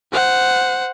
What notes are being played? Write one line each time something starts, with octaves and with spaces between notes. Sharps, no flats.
C5 F#5